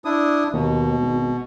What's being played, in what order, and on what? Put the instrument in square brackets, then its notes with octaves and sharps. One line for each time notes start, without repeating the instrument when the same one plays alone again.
[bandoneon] D4 E4 D#6
[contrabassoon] D#2 [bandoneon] B2
[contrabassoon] G#1